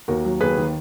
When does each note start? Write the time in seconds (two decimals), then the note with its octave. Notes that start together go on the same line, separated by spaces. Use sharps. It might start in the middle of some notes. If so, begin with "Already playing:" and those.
0.08 D#2 F#4 A#4
0.25 F#3
0.40 D#2 G#4 B4
0.57 D#3